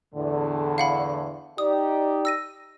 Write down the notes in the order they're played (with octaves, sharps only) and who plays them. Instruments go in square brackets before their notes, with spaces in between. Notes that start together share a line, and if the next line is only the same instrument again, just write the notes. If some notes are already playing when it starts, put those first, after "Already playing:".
[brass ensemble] E2 A2 D3
[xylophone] F5 F#5 B5
[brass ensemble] D#4 G4 D5 [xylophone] D#6
[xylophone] E6 A#6 D#7